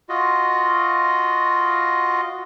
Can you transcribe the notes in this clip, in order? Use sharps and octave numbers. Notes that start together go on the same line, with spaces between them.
F4 F#4 D#5